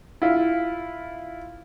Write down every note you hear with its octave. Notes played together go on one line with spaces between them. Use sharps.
E4 F4